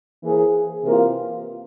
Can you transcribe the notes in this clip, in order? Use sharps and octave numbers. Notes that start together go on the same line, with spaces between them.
E3 A#3 E4 G#4 C5
C3 E3 A#3 F4 A#4